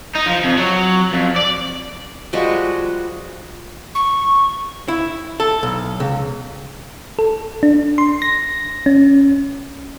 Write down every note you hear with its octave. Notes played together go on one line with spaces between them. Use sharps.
D#4
F3
F2
F#3
F2
D5
F3 G3 G#3 F#4
C#6
E4
A4
B1
C#2
A4
D4
C6
A#6
C#4